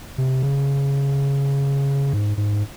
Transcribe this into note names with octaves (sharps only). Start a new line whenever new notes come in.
C3
C#3
G#2
G#2